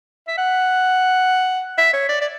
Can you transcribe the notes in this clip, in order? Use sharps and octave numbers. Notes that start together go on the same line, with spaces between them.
E5
F#5
E5
C#5
D5
D5